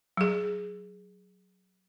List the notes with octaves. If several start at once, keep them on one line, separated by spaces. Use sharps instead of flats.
F#3 G#4